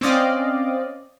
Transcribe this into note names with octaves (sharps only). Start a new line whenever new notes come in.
C4 C#4 D5 D#5 F5